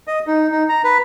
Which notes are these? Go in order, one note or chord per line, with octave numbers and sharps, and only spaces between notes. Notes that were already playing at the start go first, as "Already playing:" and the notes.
D#5
D#4
D#4
A#5
B4